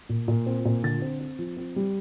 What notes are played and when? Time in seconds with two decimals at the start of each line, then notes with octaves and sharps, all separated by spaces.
0.09 A#2
0.28 A#2
0.46 C4
0.65 A#2
0.83 D3 A6
1.02 C4
1.20 C4
1.39 F3
1.57 C4
1.76 G3